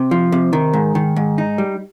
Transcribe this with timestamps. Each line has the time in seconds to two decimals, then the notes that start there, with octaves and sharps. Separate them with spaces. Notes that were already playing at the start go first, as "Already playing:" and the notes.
Already playing: C3
0.11 F3
0.32 C3
0.53 D#3
0.73 G#2
0.95 D#3
1.16 G#2
1.38 D#4
1.58 G3